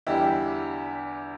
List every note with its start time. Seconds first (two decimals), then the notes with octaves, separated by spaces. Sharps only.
0.07 E2 D3 G3 E4 G4